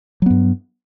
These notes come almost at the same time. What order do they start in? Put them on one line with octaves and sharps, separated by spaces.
F#3 B3 G2